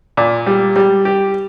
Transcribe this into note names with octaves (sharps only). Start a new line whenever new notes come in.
A#2
G3
G3
G4